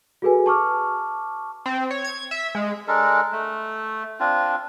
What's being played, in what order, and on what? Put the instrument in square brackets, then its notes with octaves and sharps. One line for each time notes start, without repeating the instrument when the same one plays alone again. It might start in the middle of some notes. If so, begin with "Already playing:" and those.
[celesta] F#4 G#4 A4 B4 G#5
A5 C#6 D6 F6
[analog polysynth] C4
C#5
G#6
E5
G#3
[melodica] G#3 D4 A4 A#4
A3
C4 D4 F4